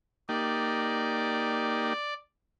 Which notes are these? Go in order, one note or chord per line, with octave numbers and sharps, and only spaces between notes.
A#3 D#4 G4 D5